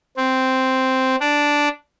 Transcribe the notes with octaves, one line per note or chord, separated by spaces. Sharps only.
C4
D4